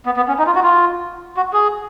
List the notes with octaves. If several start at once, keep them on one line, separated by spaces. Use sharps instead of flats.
B3
B3
C#4
D#4
F4
F#4
F4
F#4
G#4